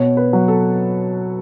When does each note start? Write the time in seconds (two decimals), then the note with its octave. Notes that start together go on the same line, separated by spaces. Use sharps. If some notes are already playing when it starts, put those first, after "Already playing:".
Already playing: B2 C#5
0.17 B4
0.33 F#3
0.48 A4